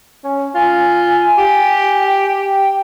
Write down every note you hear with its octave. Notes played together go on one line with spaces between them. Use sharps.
C#4
F4 G#5
G4
G5